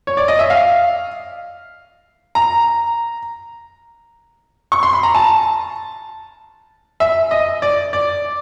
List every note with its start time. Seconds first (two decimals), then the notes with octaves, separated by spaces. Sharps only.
0.07 C#5
0.17 D5
0.28 D#5
0.39 E5
0.50 F5
2.35 A#5
4.72 C#6
4.83 C6
4.93 B5
5.03 A#5
5.15 A5
7.00 E5
7.31 D#5
7.62 D5
7.93 D5